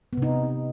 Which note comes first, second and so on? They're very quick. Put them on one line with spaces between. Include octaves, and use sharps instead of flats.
B3 C3 D#4